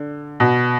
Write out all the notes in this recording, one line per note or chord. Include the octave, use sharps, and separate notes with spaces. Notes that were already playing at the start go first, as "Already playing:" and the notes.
Already playing: D3
B2